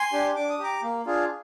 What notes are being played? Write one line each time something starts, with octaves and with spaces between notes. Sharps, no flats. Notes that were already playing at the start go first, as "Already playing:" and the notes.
Already playing: G#5 C6
D4 G4
D4 D6
D#6
G4 A#5 D6
A#3
D4 F4 G#4